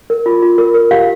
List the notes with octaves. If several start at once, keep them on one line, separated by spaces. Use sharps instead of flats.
A#4
F4
F4
A#4
A#4
G4 F5